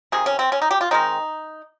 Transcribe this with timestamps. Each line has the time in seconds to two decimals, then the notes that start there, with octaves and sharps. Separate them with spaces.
0.12 C3 D#3 G#4
0.26 C#4
0.39 C4
0.52 C#4
0.62 D#4
0.71 G4
0.81 F4
0.91 D#3 G#3 C4 D#4